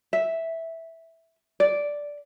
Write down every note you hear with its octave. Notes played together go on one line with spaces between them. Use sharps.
E5
D5